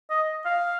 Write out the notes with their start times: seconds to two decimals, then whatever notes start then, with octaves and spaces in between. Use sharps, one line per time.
0.10 D#5
0.45 F5